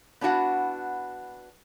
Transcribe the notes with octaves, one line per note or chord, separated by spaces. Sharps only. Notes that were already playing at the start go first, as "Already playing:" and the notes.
B3 D4 E4 F#4 F#5